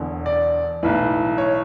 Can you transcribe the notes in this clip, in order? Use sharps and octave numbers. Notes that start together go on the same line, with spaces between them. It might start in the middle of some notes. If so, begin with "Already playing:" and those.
Already playing: E1 E2 D3
D5
B1 A2 E3 B4
C#5